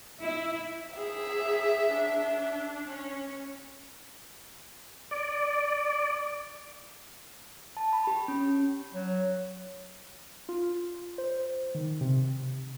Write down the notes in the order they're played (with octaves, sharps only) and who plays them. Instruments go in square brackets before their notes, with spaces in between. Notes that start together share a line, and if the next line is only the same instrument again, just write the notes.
[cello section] E4
[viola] G#4 [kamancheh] E5
[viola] D4
C#4
[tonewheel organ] D5
[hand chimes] A5
B5
G4
C#4
[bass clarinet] F#3
[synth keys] F4
C5
D#3
C3